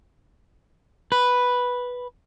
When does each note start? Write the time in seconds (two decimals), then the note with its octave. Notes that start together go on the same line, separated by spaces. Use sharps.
1.12 B4